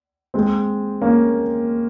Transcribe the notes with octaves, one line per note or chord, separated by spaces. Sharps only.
G#3 C4
A#3 C#4